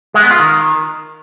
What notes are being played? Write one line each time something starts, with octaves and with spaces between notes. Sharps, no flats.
G#3
B3
F4
D#3